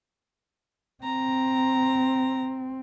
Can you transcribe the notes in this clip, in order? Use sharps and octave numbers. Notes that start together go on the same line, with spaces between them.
C4 A#5